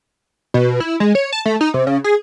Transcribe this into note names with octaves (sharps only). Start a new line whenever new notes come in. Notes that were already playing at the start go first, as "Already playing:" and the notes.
B2
E4
G#3
C#5
A5
A3
D#4
C3
C#3
G#4